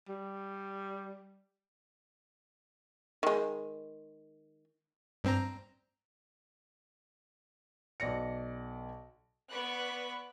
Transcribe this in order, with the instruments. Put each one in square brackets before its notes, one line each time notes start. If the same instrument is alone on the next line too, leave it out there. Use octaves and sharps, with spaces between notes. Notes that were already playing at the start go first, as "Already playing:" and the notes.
[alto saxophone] G3
[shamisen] D#3 G#3
[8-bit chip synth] G2 C4 A#5
[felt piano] B1 D5 A#6 C#7
[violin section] B3 B4 D5 B5 C#6 F#6